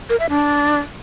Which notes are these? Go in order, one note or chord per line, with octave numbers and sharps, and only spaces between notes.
A#4
E5
D4